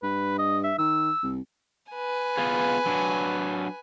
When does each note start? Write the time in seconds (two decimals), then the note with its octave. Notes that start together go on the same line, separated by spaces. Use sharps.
0.03 G2 B4
0.38 D#5
0.64 E5
0.78 D#3 E6
1.23 C2
1.92 B4 G#5
2.37 B3 F4 G#4
2.86 F#3 D4